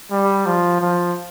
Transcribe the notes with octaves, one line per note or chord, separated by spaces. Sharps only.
G3
F3
F3